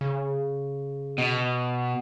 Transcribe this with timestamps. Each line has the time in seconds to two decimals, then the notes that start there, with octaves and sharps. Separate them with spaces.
0.01 C#3
1.18 B2